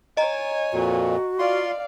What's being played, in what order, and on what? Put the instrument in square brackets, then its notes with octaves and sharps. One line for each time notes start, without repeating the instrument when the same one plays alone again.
[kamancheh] C#5 G#5 [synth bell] D#5 A#5
[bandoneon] F2 A#2 [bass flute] F#4
[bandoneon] F4 C6 [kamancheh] D5 F5